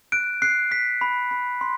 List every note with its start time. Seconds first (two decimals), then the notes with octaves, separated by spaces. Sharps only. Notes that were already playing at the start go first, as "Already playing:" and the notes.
0.12 F#6 D7
0.42 F#6 C7
0.71 F#6 B6
1.01 B5
1.31 B5
1.61 C6